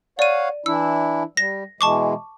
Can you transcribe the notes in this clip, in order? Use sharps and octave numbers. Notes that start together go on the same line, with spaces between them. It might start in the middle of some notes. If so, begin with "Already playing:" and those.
C#5 D5 F5 F#5 D#7
E3 D4 E4 E6
G3 A#6
B2 E3 G#3 A5 C#6 D6